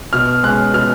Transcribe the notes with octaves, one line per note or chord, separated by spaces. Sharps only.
B2 F6
G#3 C#4 F#6
B2 F6